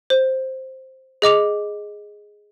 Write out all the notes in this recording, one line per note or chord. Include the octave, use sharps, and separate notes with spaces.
C5
G#4 D#5 D6 F7